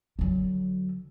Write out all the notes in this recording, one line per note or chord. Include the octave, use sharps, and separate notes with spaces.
D3 F#3